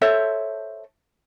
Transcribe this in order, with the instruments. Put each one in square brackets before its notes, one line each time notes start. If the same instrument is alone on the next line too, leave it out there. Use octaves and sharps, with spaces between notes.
[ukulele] A4 C5 C#5 E5